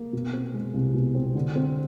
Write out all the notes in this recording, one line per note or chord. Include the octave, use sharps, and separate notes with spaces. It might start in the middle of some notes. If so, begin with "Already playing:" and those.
Already playing: A#3
B2
C4
G#3
C2
B2
C4
D3
C4